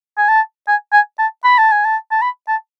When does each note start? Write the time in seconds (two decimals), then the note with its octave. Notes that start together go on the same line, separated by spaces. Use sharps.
0.18 G#5
0.29 A5
0.68 G#5
0.93 G#5
1.19 A5
1.44 B5
1.58 A5
1.72 G#5
1.85 A5
2.11 A5
2.22 B5
2.48 A5